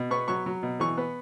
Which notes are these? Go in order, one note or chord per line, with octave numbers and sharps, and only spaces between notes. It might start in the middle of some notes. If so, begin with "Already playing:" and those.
Already playing: B2
B3 C#6
F#3 C#6
F#3
B2
E3 C#6
B3